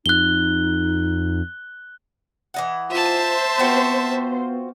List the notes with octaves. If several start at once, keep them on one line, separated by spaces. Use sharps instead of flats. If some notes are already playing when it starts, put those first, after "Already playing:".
F2 D#4 F#6 G7
E3 D#5 F#5
F4 C5 E5 A5
B3 C4 F4 F#4